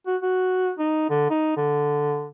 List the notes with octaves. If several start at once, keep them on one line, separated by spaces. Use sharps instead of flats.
F#4
F#4
D#4
D3
D#4
D3